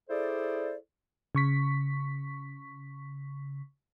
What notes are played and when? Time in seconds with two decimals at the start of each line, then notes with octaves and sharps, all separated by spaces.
0.10 E4 G#4 A4 C5 D5
1.35 C#3 C#6 B6